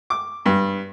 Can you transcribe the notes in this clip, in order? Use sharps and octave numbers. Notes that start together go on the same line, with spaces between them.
D6
G2